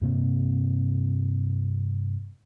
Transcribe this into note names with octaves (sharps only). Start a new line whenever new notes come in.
G2 C3 A#3 C4